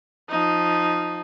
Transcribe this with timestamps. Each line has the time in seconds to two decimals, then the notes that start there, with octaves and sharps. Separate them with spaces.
0.29 F3 D#4